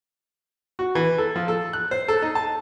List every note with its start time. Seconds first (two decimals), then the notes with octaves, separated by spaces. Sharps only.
0.79 F#4
0.95 E3
1.18 A4
1.36 F3
1.48 A4
1.73 F#6
1.91 C5
2.08 A4
2.22 D#4
2.35 A5